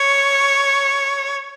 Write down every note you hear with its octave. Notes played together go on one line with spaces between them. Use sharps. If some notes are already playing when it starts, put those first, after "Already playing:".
Already playing: C#5